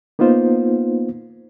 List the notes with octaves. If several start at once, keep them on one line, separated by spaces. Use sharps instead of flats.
A#3 B3 D#4 F4 C5